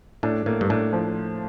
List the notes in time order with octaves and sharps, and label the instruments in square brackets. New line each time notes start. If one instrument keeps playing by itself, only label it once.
[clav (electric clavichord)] A2 [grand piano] D4
[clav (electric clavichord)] A2 [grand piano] A#3
[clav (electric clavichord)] G2
[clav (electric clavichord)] A2 [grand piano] D4
[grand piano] F3